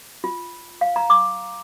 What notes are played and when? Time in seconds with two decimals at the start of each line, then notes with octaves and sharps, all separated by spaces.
0.24 F4
0.81 F5
0.96 A#5
1.10 D6